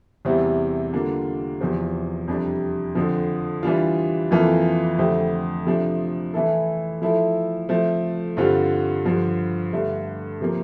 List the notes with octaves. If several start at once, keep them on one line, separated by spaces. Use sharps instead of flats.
E2 C3 G3 C4 E4
D3 G3 A#3 D4 F4
E2 C3 F3 C4
F2 C3 G3 D4
F2 D3 F3
E3 G3 D4 F4
F2 E3 A#3 F4 A4
F2 D3 A3 C4 G4
C3 F3 A3 D4
E3 A3 E4 A4
F3 A3 E4 A4
F3 A3 C4
G2 D3 G3 C4 F4
G2 D3 F3
G2 D3 A3
C3 F3 A#3